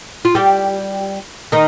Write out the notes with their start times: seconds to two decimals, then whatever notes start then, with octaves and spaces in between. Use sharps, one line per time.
0.25 F4
0.35 G3 G4
1.52 D#3 D#4